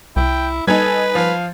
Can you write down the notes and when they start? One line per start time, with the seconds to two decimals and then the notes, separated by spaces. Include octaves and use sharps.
0.16 C2 E4 G5
0.67 G3 D#4 A4 B4 G#5 G#6
1.15 F3 F5